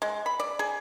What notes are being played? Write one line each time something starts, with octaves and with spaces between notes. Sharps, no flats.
G#3
B5
D5
G#4